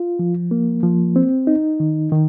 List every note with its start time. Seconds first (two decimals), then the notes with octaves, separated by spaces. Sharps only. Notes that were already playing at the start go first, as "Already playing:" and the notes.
Already playing: F4
0.19 F3
0.51 A#3
0.83 F3
1.16 C4
1.47 D#4
1.80 D#3
2.12 D#3